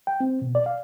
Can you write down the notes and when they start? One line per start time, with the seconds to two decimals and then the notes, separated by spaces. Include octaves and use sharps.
0.07 G5
0.20 C4
0.42 B2
0.55 D5
0.66 F5